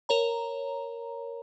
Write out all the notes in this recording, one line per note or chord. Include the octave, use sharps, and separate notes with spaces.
A#4 C#5 A#5